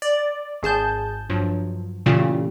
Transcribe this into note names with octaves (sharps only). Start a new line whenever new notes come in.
D5
G#1 G#4 A5 G6
G2 F3 F#3
A#2 C#3 E3 A3 F4 G4